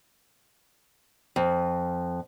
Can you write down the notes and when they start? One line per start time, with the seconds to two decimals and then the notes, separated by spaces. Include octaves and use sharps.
1.36 F2